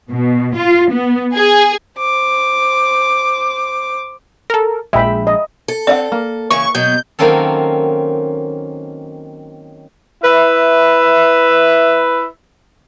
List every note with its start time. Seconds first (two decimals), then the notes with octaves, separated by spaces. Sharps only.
0.12 B2
0.56 F4
0.93 B3
1.35 G#4
1.98 C5 D6
4.50 A4 A#4
4.93 A#1 G#3 E5 G5 B5
5.27 D#5
5.68 A4
5.87 C4 D5 D#5 F#5
6.12 A#3
6.51 C#3 E3 C#6
6.75 B2 F#3 G6
7.19 D#3 F#3 A#3 C4 C#4 A4
10.24 E4 B4 E5